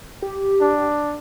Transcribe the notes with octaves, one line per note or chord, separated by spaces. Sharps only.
G4
D4